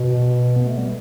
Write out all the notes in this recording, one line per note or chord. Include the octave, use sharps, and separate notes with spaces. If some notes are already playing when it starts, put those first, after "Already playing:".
Already playing: B2
B3
A3
G3